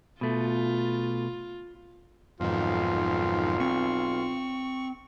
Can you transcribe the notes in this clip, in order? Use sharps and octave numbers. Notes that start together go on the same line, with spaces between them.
B2 A3 F4
B1 F2 G#2 D#3 F4
C4 C#6